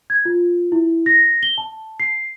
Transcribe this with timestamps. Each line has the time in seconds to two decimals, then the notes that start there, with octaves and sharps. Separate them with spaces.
0.10 G#6
0.25 F4
0.72 E4
1.06 A#6
1.43 G7
1.58 A5
2.00 C7